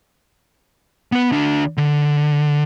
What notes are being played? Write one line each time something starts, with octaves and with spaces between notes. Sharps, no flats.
B3 B4
D2 D4
D3